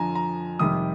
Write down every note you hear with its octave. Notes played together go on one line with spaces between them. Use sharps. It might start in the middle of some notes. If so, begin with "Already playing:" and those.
Already playing: F2 D3 F3 G#5 A#5
A#5
F2 C3 D#3 G3 D#6